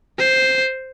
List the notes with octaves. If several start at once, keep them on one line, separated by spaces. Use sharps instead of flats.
C5